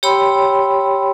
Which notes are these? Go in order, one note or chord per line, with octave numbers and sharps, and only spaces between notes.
G4 C#5 G5 B5 C6 E6